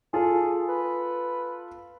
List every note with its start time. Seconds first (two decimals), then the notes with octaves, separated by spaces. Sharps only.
0.14 F4 G#4 A4
0.69 B4